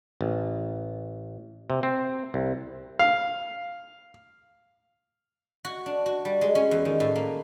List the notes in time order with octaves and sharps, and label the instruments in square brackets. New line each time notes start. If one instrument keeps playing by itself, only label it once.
[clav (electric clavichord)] A1
C3
C4
C2
[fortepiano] F5
[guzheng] F#4
D4
F#4
G3
G#3
C#4
E2
D#3
A2
A#3